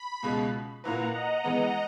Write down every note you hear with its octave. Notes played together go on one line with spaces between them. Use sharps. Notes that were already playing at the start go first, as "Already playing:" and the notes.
Already playing: B5
C#2 B2 G#3
A#2 A#3 E4 B4 F#5 A#5
D#5 F#5
E3 G#3 B3